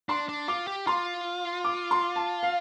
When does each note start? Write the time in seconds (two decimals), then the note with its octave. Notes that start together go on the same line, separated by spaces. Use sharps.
0.09 D4 C6
0.29 D4
0.48 F4 D6
0.67 G4
0.87 F4 C6
1.64 D6
1.91 C6
2.16 A5
2.43 F5